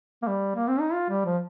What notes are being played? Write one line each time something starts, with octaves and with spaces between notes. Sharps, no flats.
A#3
G3
A#3
C4
D#4
F4
G3
F3